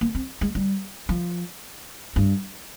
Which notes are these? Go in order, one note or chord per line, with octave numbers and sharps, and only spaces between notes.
A#3
C4
G#3
G3
F3
G2